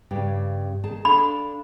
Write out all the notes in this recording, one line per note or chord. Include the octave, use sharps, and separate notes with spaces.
G2 C#3 G4
D#3 G#4 A5
D4 A4 F5 B5